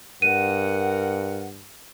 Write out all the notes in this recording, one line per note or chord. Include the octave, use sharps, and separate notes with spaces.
G2 A#4 F#5 D#7